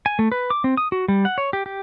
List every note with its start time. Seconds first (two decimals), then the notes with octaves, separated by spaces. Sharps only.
0.06 G#5
0.19 A3
0.32 B4
0.50 D6
0.64 C4
0.77 D#6
0.92 F#4
1.08 G3
1.25 F#5
1.38 C#5
1.53 G4
1.66 G4